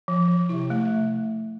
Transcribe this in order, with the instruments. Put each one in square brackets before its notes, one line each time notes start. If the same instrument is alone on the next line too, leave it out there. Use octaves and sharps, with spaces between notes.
[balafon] F3
F3
[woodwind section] C3 [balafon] E4
[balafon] A3